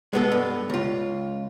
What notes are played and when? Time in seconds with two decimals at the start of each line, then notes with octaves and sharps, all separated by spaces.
0.13 G#3 B3 A4
0.32 G2
0.70 C#2 F4